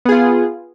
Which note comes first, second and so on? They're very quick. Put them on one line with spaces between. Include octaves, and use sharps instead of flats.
B3 G#4 F4